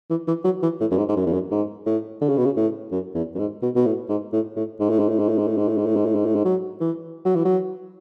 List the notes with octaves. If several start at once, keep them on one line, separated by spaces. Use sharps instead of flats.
E3
E3
F#3
E3
A2
F#2
G#2
G#2
F#2
E2
F#2
G#2
A2
D3
C#3
B2
C#3
A2
F#2
E2
F#2
G#2
B2
B2
A2
G#2
A2
A2
G#2
A2
G#2
A2
G#2
A2
G#2
A2
G#2
A2
G#2
A2
G#2
A2
G#2
A2
G#2
F#3
E3
F#3
E3
F#3